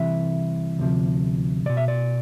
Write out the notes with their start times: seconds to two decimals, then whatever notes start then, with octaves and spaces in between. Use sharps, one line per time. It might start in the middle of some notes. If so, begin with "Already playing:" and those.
Already playing: C2 C3 E3 E5
0.79 D2 C3 F3
1.66 C2 B2 D5
1.77 E5
1.88 D5